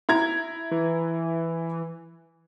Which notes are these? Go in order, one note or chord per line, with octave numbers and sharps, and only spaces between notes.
E4 A#5 G#6
E3